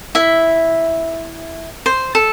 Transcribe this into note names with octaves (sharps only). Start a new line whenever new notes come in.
E4 E5
C5
A4